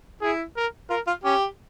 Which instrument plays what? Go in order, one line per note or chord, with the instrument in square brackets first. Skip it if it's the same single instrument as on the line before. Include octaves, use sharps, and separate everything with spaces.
[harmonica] E4 [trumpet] G#4
[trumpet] A#4
[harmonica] F4 [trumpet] A#4
[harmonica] F4
[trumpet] C#4 [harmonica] G4